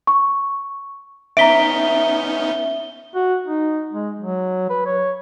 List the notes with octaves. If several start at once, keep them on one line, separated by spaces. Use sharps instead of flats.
C#6
B3 C#4 D#4 E5 A#5 B6 D7 G7
F#4
D#4
G#3
F#3
B4
C#5